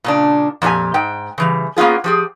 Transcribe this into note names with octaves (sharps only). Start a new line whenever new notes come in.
A#2 C#3 D4
F2 A#2 E4 G4 G#5
G#2 G5
C#3 E3 G3
A#3 B3 C#4 F4 G#4
F3 G4 G#4